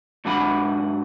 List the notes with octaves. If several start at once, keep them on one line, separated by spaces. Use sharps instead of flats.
G#2 F#3 D4 F#5 B5